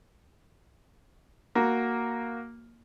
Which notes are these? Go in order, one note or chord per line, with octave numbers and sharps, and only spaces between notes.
A#3 F#4